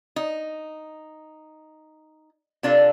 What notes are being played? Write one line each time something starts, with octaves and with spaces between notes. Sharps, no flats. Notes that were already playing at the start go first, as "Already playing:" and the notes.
D#4
C3 D4 F4 A4